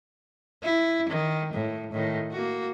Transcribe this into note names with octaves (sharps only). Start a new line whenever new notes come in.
E4
D#3
A2
A2 D#3
A#3 F#4